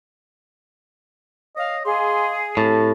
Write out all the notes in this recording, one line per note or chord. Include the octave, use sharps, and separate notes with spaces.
C#5 D#5 F5
G#4 D#5 F5 C6 D6
A2 C4 G4 A4 A5